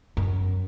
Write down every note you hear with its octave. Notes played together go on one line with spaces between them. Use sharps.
F#2